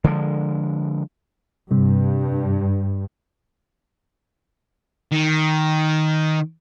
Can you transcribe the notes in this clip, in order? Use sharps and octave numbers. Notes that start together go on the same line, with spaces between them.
D3 F3 G#3
G2 C3 G3
D#3